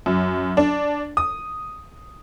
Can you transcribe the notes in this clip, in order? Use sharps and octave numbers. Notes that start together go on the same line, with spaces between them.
F#2
D4
D#6